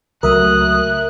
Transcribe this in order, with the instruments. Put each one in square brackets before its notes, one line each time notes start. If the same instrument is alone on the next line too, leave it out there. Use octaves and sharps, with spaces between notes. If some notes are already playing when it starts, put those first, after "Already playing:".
[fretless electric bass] C#2 F#3 A3 [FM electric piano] A#4 E5 [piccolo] D#6 [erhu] F#6